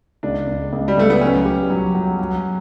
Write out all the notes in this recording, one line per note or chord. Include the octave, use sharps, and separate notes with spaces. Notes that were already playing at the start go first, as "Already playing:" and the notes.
C#2 D4
C#2
C#2
G3
C#2 A3
B3
F#3 C#4
G4
F#3
F#3
F#3